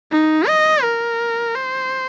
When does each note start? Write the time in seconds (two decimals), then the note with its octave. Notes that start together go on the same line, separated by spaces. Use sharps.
0.11 D#4
0.47 D#5
0.83 A#4
1.54 C5